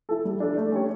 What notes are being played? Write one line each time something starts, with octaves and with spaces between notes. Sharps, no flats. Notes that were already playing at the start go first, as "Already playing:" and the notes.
E4 A4
G3
D4 A4 D5
A3
C#4 G4 C#5